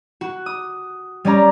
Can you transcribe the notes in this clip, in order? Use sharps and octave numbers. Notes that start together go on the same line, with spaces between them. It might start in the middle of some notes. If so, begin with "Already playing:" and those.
F#4
D#6
G3 C#4 D5 A#5